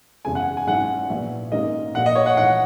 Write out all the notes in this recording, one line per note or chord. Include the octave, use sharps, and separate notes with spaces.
F#1 E2 C#3 G#3 G#5
F#5
G#5
G#1 G#2 F#3 C#4 E4 F#5
A#1 A#2 F#3 B3 E4
G#1 G#2 D#3 A#3 C#4 D#5
A#1 A#2 A#3 F#5
D#5
C#5
F#5
A#1 G#2 E3 F#5